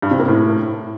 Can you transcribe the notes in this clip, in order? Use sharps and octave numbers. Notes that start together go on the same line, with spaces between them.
G2
C3
A#3
A2